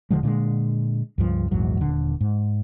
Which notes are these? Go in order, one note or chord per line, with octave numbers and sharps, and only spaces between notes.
E1 D3 F3 G#3
A#2 D3 G3 G#3
C#2 G2 F3
A#1 E2 G#2 F#3
D#1 D3
G#2